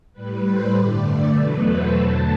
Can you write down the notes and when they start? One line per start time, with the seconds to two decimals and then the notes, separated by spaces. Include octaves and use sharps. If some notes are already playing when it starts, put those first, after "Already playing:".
0.13 A2 G3 B4
0.43 C5
0.72 G2 D3 A3 D5
1.33 E2 B2 F#3 A3 B4
1.64 C5
1.94 E2 D3 F#3 A3 A5